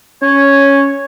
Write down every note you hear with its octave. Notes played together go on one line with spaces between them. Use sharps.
C#4 C#5